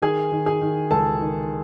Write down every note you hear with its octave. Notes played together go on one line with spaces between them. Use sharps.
D#3 G#4 G#5
D#3
G#4 G#5
D#3
C#2 A4 A5
D#3